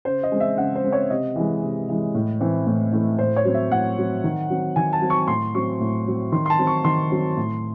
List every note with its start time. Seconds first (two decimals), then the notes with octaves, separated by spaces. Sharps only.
0.05 C#3 C5
0.23 D#5
0.32 G#3 C4
0.40 E5
0.58 C#3 F#5
0.75 C5
0.84 G#3 C4
0.92 C#5
1.10 C3 D#5
1.36 E3 G#3
1.63 C3
1.89 E3 G#3
2.15 A2
2.40 E3 A3 C4
2.67 A2
2.92 E3 A3 C4
3.19 A2 C5
3.36 C#5
3.45 F#3 C4
3.54 E5
3.71 A2 F#5
3.98 F#3 C4
4.24 D#3
4.50 F#3 C4
4.76 D#3 G#5
4.93 A5
5.01 F#3 C4
5.10 C#6
5.28 A2 C6
5.55 F#3 C4 C#6
5.80 A2
6.07 F#3 C4
6.32 D#3 C6
6.46 C6
6.50 A5
6.58 F#3 C4
6.67 C#6
6.84 D#3 C6
7.11 F#3 C4
7.37 A2